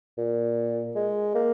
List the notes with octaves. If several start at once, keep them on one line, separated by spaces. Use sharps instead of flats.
A#2
G#3
A#3